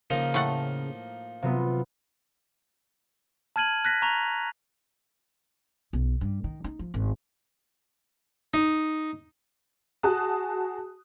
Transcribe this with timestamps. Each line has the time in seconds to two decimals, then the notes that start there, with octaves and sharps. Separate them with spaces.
0.10 C#3 F3 A#3 D#4
0.34 A2 A3 F#5
1.43 C3 F#3 B3 F4
3.56 A5 F6 G#6 D#7 F#7
3.85 F#6 A#6 B6
4.02 A#5 C#6 F7
5.93 B1
6.21 G2
6.44 D#3
6.64 D#4
6.79 F3
6.94 G#1
8.54 D#4
10.03 F#4 G#4 A5 D#6 F#6